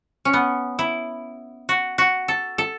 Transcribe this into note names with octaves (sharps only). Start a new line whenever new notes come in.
C#4
B3
E4
F#4
F#4
A4
A4